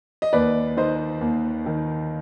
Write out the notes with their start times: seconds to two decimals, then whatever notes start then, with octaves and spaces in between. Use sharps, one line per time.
0.22 D#5
0.33 D#2 B4 D5
0.77 D#3 C5 D#5
1.21 D#2
1.66 D#3